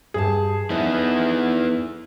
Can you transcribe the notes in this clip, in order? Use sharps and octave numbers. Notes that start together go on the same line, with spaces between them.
G2 G#4 A5
F2 B3 D#4 E4